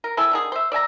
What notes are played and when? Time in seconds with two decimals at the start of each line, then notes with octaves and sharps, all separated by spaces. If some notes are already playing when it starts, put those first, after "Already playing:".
0.04 A#4
0.17 C4 E4 A4 G#5
0.32 D3 D#3 G#4
0.52 C5 E5
0.72 D5 E5 G#5 A#5